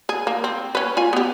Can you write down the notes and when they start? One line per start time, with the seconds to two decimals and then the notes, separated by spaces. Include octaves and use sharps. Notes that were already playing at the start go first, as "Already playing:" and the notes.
0.09 G#4
0.27 A#3
0.44 C4
0.75 C#4 B4
0.97 F4 G#5
1.13 B3 G4